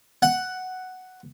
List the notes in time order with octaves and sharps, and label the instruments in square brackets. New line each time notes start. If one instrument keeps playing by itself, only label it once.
[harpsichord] F#5